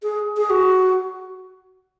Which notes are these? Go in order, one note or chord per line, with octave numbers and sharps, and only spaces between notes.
G#4
G#4
F#4